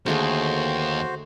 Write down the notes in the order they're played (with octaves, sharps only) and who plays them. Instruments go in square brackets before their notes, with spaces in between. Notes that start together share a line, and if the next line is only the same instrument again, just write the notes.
[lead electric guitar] D#2 [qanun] D3 A3 G#4 [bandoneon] F#4 C5